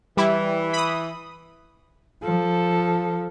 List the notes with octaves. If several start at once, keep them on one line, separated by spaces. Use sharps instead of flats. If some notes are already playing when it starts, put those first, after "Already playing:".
E3 G3 E4
B5 D#6
F3 A4